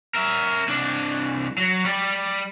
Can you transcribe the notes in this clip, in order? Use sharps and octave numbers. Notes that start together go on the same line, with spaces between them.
A#4 E5
C2 D4
F#3
G3 D5